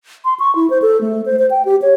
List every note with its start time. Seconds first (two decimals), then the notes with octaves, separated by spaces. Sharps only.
0.25 C6
0.40 C#6
0.55 E4
0.70 C5
0.82 A4
1.01 A3
1.26 C5
1.39 C5
1.50 G5
1.65 G4
1.82 C#5